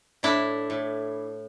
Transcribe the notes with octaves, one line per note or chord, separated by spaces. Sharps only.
A2 D4 E4
A2